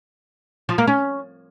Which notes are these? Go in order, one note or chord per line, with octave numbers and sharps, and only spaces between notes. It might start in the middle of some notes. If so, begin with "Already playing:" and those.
F3
A#3
C#4